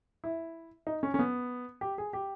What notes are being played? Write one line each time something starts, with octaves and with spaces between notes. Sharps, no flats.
E4
D#4
C#4
C#4
B3
G4
G#4
G4